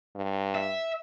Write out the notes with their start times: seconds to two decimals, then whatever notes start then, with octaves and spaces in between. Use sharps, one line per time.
0.15 G2
0.55 E5